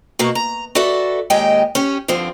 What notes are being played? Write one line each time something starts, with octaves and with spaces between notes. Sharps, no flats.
B2 A3 A#3 F#4
A#5
F#4 A4 B4 D5 E5
D#2 A#2 G#3 G4 D#5 G5
C#4 G4
G2 D3 F3 C4